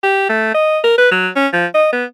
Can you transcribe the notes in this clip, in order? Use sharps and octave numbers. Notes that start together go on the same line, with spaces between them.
G4
A3
D#5
A#4
B4
F#3
C#4
F3
D#5
B3